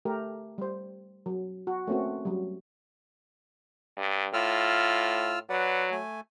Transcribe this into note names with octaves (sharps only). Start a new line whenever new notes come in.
A3 G4 A#4
G3 C5
F#3
F#4
A3 A#3 C4 C#4 F#4
F#3 G3
G2
A2 F4 E6 F6
F#3 B4 D5 F#5
A3 G#5